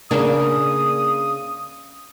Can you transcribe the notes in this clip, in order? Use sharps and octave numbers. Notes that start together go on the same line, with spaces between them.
C#3 A#3 D4 D#6